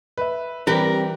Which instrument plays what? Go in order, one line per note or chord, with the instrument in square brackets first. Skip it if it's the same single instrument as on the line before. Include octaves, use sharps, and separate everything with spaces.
[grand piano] B4 E5
[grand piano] E3 [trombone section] G3 C4 [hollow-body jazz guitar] G4 B4 [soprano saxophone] A#4